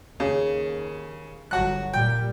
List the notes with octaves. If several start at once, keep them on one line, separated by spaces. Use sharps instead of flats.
D#2 C#3
G1 F#3 F#4 F#6
A#2 G3 G5